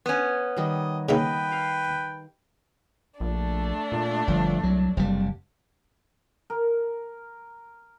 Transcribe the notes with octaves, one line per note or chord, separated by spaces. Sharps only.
B3 C#4
D#3 G3 D#5
C#3 A#3 D#4 B4 D#5 G5
F5
A#1 A3 D4
A#2
G1 F3
C2 F#3
F#1 C3 G3
A#4